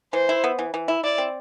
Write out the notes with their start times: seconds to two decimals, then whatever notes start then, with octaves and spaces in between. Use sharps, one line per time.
0.13 E3 C5
0.29 E4
0.44 B3
0.59 E3
0.74 E3
0.88 E4
1.04 E4 D5
1.18 C4